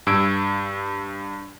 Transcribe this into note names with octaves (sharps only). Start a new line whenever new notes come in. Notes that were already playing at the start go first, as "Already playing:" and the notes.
G2 E6 G#6 D7